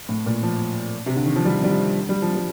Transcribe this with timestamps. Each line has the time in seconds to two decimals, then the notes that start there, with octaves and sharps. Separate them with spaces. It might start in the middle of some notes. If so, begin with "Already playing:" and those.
0.09 A2
0.26 A#2
0.43 F3
1.06 C3
1.16 D3
1.26 D#3
1.36 F3
1.45 G3
1.64 G3
1.70 F3
2.09 G3
2.22 F3
2.35 G3